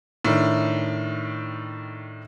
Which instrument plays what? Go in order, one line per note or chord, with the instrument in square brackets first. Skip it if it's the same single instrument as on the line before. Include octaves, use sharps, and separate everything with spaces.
[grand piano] A2 D#3 D4